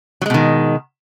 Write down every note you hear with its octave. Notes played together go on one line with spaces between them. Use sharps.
B2 D#3 F#3 G#3